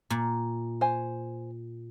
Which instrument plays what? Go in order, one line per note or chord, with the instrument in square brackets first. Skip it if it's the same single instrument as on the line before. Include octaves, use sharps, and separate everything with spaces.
[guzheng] A#2
[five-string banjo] C5 G#5